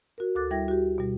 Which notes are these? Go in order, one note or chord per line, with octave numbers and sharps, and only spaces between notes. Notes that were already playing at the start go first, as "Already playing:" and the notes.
F#4 A#4
D2 A4 D6 F#6 A6
G3 E4 E5 G5 G#6 A#6
F#4 G4
B2 G3